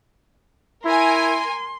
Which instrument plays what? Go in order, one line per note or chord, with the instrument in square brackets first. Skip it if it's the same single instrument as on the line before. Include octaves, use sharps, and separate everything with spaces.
[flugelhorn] E4 [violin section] A#4 G#5 [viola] C6